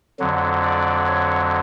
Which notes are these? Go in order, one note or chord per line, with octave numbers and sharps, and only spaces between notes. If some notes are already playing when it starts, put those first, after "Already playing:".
F2 D3 F#3
D5
C#5